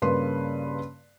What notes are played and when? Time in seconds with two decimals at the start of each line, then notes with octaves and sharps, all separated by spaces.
0.02 G2 C#3 A#3 B4 C6